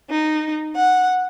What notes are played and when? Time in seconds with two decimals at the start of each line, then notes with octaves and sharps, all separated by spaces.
0.11 D#4
0.76 F#5